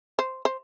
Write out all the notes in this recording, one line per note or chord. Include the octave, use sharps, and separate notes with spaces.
C5
C5